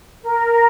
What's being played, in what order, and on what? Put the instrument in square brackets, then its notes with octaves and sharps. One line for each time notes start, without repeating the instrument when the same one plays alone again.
[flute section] A#4